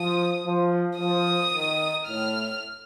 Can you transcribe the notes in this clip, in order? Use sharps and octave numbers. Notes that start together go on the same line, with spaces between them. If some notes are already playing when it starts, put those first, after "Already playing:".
Already playing: F3 D#6
F3
F3 D#6
D#3
A2 F6